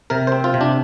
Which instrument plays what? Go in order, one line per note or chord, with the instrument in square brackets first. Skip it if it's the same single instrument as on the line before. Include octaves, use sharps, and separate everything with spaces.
[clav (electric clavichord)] C3 A#4
C4 C5
F4
C3
D4